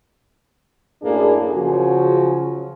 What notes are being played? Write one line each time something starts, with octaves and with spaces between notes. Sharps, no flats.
F#2 A2 A#3 D4 G#4
C#3 F3 F#3 C#4 F#4 G#4